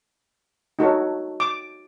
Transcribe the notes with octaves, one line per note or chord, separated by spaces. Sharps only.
D#4 F#4 A4 C#5
D6